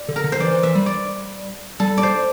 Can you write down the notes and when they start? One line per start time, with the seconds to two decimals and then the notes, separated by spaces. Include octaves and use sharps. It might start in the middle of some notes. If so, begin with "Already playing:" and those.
Already playing: D5
0.09 D3
0.16 A#4
0.24 D3
0.32 C5
0.40 E3 D5
0.51 E3
0.63 E3 E5
0.75 G3
0.86 D5
1.80 G3 A4
1.98 D5
2.03 C5